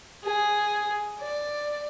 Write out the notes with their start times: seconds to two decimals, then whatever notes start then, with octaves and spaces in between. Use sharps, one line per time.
0.24 G#4
1.20 D5